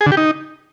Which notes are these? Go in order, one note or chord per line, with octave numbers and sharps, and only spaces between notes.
G#4
D3
G4
D#4